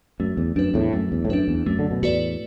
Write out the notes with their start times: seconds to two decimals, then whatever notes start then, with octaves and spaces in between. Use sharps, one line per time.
0.20 F#2 A3
0.37 E2
0.56 F#2 D4 B4
0.74 E2 A2
0.93 F#2 A3
1.12 E2
1.25 A2
1.29 F#2 D4 B4
1.48 E2
1.66 F#2 A3
1.79 D3
1.91 B2
2.02 E2 A2 F#4 B4 D5